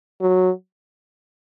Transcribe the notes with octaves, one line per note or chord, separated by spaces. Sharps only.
F#3